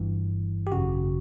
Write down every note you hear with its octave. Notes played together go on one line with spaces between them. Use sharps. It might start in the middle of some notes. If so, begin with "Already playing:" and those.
Already playing: G1 G2 E3
G4
G#1 F#2 C#3 F#4